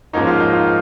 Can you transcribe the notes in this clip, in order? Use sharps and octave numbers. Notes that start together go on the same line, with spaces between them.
G#2 F3 A#3 C#4 D#4
F4
D#4
F4